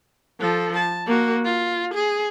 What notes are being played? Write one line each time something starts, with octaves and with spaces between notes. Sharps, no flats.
F3 A4
A5
A#3 F#4
F4
G#4